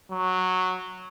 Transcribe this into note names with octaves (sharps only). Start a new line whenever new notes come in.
F#3